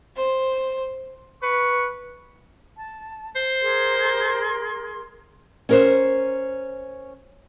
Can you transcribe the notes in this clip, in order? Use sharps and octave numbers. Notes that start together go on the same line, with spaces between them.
C5
B4 C#6
A5
C5
G#4 A#4 C6
C#4 A#4 C5